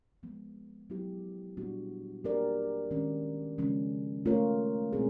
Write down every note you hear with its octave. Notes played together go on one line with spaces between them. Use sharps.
F3 G#3 B3
F#3 B3 E4 G4
A#2 G3 B3 D4 F#4
A#3 D4 G4 A#4 D5
D#3 G#3 C#4
C#3 F3 G#3 C#4
A3 C#4 F4 A#4 C#5
B2 G#3 C4 D#4 G#4